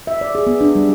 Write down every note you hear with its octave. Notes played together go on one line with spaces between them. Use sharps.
E5
D5
G#4
B3
D4
G3